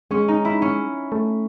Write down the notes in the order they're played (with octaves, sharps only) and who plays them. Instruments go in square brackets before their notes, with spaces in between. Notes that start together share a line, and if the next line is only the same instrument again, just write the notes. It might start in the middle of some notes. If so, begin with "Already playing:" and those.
[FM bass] G#3 [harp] C#4
[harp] D#4
E4
C#4
[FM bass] A3